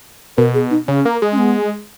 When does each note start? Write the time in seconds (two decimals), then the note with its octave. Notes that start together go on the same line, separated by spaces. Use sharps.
0.37 B2 A#4
0.54 G#4
0.71 D#4
0.88 C#3 C#4
1.05 A#3
1.22 G#3
1.32 C#4
1.38 B3